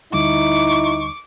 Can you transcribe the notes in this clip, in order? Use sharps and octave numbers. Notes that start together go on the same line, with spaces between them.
D2 D3 G3 D#4 E4 C#6 D6